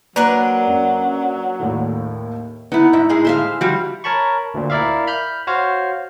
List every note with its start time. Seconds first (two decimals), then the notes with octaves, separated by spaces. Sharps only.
0.16 F#3 A#3 D4 A#4 B4
0.67 F#2
1.60 D#2 A2 D#3
2.72 B3 D#4 E4
2.93 G#2 E5
3.09 A2 G#3 G#4
3.25 C5 E5 F5
3.61 F3 G3 F#4
4.04 A#4 C#5 A5 B5 C#6
4.54 D2 A#2
4.70 E4 A#4 D5 E5 F5
5.07 B5 F6 G6
5.47 F#4 C5 C#5 F5